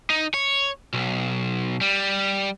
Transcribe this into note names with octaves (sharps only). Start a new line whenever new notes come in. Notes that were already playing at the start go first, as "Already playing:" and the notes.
D#4
C#5
B1
G3